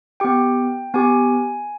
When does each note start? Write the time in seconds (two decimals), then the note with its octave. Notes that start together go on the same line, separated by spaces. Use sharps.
0.20 B3 G4 G5
0.94 B3 G4 G#5